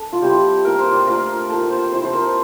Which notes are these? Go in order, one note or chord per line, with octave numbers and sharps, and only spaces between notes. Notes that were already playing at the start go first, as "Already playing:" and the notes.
Already playing: D4 A4
F4
G3 C4 E4 G4
A#3 F4 A#4
C5
D5
A3 D4 F4 A#4
A#3 F4 A4
C5
F3 C4 E4 C5
C5
A#4